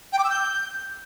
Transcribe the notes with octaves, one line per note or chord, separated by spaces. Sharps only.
G5
D6
E6
G6